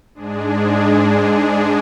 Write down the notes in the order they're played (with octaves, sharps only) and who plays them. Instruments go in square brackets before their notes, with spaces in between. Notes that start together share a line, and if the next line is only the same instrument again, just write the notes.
[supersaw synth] G#2 G#3 D4 G#4